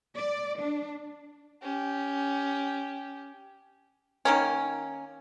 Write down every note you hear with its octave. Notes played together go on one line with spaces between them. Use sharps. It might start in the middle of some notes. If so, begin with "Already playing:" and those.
D5
D4
C#4 G4
D#3 A#3 C#4